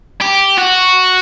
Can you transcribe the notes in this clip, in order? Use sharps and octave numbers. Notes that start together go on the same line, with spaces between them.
G4
F#4